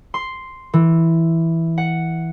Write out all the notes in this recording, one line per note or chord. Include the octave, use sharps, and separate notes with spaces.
C6
E3
F#5